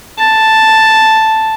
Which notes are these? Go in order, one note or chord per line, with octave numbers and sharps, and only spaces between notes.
A5